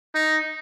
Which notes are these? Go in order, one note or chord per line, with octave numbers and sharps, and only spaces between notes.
D#4